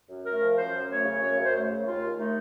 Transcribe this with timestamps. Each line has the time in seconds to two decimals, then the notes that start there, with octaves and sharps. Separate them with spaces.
0.09 F#2
0.25 A3 A#4
0.41 F3
0.57 F#2 C5
0.74 F#2
0.90 A3 C#5
1.05 C#3
1.21 F#2 C#5
1.39 F#2
1.44 C5
1.55 A3
1.70 C#3
1.86 D#2 F4
2.03 D#2
2.18 A3 D#4